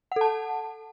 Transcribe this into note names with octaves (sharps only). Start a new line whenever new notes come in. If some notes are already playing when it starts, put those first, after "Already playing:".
A4 F#5 A5